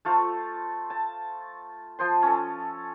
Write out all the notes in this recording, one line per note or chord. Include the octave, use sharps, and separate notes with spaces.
A3 F4 A4 C5
A5
F3 C5 C6
C#4 A4